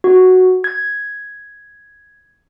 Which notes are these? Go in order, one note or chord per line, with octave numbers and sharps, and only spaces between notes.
F#4
G#6